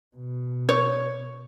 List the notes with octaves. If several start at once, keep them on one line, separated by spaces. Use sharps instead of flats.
B2
C#5